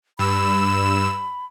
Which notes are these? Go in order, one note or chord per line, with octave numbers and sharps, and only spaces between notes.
G2 B5 E6 E7